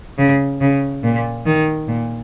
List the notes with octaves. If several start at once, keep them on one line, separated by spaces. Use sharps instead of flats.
C#3
C#3
A#2
D#3
A#2